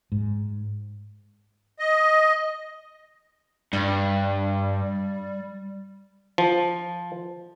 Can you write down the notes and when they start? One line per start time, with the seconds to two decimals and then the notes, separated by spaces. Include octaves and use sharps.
0.12 G#2
1.79 D#5
3.73 G2 G3
6.38 F3